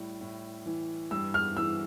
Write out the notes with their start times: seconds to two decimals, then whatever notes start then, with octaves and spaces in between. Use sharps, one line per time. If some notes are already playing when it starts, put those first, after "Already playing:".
Already playing: A2 G3
0.21 A2
0.66 E3
1.11 G2 E6
1.34 F6
1.57 E3 E6